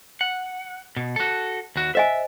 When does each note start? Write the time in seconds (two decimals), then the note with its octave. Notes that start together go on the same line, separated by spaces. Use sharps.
0.21 F#5
0.97 B2
1.16 F#4 A4
1.76 D#2 F#4
1.95 C5 D#5 E5 G#5